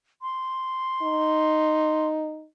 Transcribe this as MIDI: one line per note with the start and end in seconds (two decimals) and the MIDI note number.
0.22 2.07 84
1.02 2.45 63